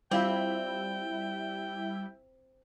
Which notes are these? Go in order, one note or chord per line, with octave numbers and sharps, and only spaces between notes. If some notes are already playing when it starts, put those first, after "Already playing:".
G3 C4 E4 F4 E5 F5 G5 D6